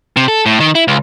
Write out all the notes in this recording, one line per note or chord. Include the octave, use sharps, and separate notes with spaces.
C3
A4
A2
D#3
E4
C#2